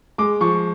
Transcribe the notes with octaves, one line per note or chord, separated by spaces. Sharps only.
G#3 D6
F3 C#6